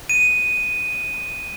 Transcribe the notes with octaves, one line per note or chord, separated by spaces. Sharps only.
D#7